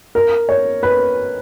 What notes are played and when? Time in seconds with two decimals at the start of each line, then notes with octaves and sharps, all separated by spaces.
0.15 A#4
0.49 C#5
0.83 B4